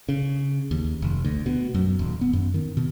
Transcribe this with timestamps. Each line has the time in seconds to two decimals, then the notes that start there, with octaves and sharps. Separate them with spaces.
0.09 C#3
0.71 D#2
1.02 F1
1.24 D2
1.46 B2
1.74 F#2
1.99 D#1
2.21 B3
2.33 F#2
2.54 D#3
2.77 B2